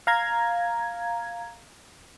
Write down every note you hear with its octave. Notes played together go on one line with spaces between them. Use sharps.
F5 A#5 G#6